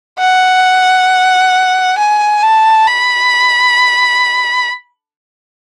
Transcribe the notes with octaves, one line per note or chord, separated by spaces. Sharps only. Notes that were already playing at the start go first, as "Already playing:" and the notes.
F#5
G#5
A5
B5